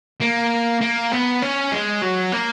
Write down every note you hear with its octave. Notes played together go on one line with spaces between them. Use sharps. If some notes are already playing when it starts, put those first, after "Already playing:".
A#3
A#3
B3
C#4
G#3
F#3
A#3